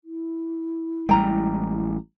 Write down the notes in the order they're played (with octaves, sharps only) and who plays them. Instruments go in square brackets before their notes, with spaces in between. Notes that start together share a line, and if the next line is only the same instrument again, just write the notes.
[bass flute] E4
[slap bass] A1 G3 G#3 [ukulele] G5 A#5